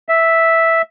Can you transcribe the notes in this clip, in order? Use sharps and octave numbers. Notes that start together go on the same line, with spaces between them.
E5